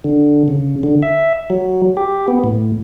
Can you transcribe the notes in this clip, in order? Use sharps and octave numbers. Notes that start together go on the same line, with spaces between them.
D3
C#3
D3
E5
F#3
G4
B3
A2